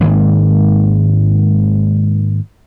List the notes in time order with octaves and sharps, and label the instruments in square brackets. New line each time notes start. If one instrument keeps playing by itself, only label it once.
[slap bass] G#2 D#3 G#3 A#3